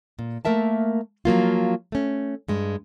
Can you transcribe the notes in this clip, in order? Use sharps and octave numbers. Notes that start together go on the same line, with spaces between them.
A#2
A3 A#3 A#4 E5 A5
F3 F#3 A#3 F4
A3 C#4
G2 G#3